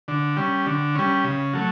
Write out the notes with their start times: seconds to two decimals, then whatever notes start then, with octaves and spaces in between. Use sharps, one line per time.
0.08 D3
0.37 G3 C#4
0.67 D3
0.96 G3 C#4
1.24 C#3
1.54 F#3 A3